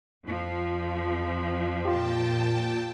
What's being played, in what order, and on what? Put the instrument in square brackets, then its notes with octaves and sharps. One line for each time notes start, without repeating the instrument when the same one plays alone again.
[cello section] F2 F3
[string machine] A#2 G5 A5 [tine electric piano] F4 G4